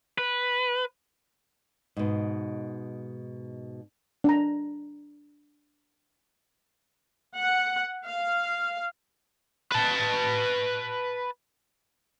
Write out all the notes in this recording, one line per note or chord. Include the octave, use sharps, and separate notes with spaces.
B4
G#2 B2
D4 A#5
F#5
F5
B4 A5